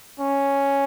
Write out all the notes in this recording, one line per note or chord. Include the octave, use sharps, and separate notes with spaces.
C#4